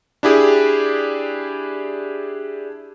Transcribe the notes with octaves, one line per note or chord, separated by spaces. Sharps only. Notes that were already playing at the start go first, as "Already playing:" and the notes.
D4 E4 G4 G#4